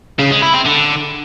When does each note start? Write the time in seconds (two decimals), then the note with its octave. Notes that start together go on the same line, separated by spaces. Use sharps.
0.19 C#3
0.31 G#3
0.42 E4
0.54 C4
0.65 D3